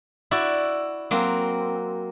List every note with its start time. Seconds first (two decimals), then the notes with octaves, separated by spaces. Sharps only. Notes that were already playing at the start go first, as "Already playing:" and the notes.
0.31 E4 F#4 D5
1.11 F#3 A#3 C4